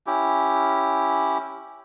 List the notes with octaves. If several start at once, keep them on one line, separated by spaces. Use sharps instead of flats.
C#4 E4 G4